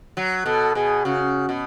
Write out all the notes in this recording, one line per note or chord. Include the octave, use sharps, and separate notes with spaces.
F#3
B2 A4
B2 G#4
C#3 F#4
B2